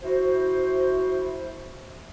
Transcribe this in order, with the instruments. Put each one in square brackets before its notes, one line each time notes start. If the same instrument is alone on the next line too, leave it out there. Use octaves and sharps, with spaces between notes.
[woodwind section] E4 F#4 C5